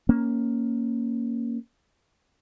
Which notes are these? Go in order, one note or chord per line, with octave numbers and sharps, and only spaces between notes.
A#3 C#4